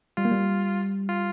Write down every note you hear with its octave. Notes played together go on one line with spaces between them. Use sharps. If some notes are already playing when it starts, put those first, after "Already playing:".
G3 F4
A#3
G3
F4